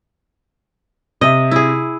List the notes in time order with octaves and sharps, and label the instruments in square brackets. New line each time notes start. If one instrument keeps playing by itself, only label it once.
[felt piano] C3 E5 [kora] D#5
[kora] E4 G#4